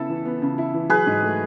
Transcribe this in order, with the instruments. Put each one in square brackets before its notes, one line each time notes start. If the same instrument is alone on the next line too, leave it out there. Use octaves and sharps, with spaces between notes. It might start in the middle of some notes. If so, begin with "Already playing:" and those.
Already playing: [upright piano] C#3 B3 E4 [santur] A4
[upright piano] E3
B3
C#3
E4
E3
[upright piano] F#3 [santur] G#4 B4
[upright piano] G#2
A3